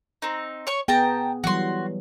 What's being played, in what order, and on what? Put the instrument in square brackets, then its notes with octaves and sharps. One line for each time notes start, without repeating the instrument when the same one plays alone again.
[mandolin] C4 D#4
C#5 C#6
[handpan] B3 G#4 [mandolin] G5 A5 A#5
[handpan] E3 F#3 G3 [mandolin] F#4 C6